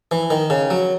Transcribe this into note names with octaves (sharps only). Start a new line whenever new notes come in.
E3
D#3
C#3
F#3